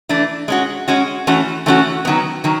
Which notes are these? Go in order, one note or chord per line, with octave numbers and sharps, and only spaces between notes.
E3 A3 D4
G#3 C#4 F#4
G#3 C#4 F#4
E3 A3 C#4 F#4
E3 A3 C#4 F#4
D#3 F#3 B3
D#3 F#3